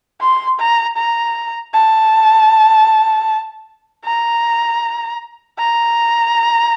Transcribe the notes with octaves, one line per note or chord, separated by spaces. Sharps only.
C6
A#5
A#5
A5
A#5
A#5